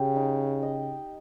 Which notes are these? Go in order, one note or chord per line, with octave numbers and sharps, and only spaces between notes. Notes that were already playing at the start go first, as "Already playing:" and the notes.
Already playing: C#3 G4
D#4
D#5